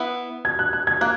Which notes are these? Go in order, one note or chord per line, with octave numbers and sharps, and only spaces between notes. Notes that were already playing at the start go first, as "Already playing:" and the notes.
Already playing: B3 E4 B4
G#6
F#6
F#6
G#6
A#3 F#6